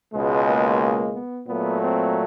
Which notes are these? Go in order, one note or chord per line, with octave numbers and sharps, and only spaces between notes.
C#2 B2 G#3
A#3
B3
A#2 F#3 A3 B3
C4